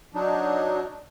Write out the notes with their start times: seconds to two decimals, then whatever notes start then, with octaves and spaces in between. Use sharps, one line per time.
0.14 F#3 D4 D#4